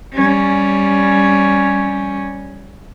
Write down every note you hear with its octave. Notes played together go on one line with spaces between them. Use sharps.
G3 C#4